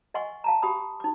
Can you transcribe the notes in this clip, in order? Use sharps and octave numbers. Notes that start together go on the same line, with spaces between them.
D#5 F#5 G#5 C6 C#6
F5 A5 A#5
G4 G5 B5 D#6
D#4 D6